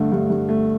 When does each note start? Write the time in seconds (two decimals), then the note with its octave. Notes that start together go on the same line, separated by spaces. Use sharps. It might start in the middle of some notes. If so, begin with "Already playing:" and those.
Already playing: G2 D3 A3
0.12 G2
0.30 G2
0.49 A3